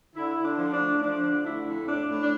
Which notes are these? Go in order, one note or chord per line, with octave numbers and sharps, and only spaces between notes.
D3 E4
D3
D4
F3
D4
A3
F3 D4
D3
A3 E4
F2
A2 D4
A2
D4